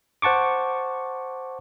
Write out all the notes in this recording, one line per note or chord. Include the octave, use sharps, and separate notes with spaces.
C5 F#5 A5 C#6 D6